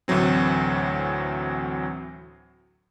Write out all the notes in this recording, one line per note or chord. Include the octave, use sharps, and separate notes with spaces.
D2 A2 E3 F#3 C4